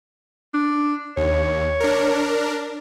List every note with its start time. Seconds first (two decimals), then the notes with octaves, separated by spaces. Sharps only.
0.54 D4
1.17 D#2 C#5
1.80 D4 A#4